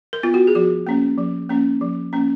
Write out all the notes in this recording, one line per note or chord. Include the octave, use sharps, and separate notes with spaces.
A#4
B3 F4
F#4
G#4
F3 F#4
A#3 C#4
F3
A#3 C#4
F3
A#3 C#4